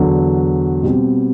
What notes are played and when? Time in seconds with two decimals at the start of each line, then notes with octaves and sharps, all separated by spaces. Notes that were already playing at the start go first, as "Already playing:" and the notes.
Already playing: E2 D3 F#3
0.82 B2 G3 C4